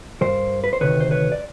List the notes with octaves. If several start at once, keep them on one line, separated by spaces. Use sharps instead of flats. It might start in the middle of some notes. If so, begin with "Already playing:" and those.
G2 D#3 A#4 C5
B4
C5
D2 C3 D#3 B4 C#5
C5
B4 C#5
D5